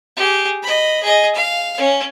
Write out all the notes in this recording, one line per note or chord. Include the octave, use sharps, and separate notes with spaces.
G4 G#4
D#5 B5
G#4 D#5
F5
C#4